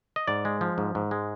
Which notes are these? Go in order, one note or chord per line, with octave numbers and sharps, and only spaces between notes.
D#5
G#2 D5
G#3
F3
G#2
G#2
G#3